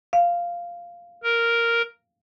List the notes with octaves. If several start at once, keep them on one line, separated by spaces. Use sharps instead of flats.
F5
A#4